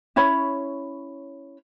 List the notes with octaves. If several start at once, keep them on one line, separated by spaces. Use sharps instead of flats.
C#4 E4 C#5 B5